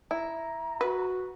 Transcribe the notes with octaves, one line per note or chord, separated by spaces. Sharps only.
E4 A#5
F#4 B4